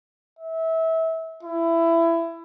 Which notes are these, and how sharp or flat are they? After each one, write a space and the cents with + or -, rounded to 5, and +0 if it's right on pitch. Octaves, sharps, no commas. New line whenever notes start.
E5 -25
E4 +20